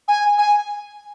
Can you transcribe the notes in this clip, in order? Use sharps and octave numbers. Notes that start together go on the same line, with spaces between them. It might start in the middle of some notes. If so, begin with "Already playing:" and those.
G#5
G#5